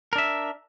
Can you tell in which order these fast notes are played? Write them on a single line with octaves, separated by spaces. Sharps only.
A#4 D4 E5